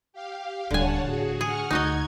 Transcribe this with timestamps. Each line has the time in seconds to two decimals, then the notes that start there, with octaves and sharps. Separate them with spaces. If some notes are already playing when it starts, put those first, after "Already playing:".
0.13 G4 F5
0.71 D#1 D3 G3 C#5 F#5 G#5 A5
1.04 A2 F#4 G#4
1.41 G#4 F#5 C#6 F6
1.71 D2 D#4 F#4 D#5 G#6